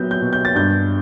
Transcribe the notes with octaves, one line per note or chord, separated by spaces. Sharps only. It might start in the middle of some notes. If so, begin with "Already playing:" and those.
Already playing: F#3 B3 G6
G6
B2
G6
A6
G2 G6